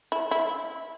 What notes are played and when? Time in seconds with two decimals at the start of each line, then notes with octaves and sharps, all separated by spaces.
0.12 E4
0.31 E4